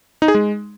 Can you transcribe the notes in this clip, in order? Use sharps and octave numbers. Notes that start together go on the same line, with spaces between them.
D#4
G#4
G#3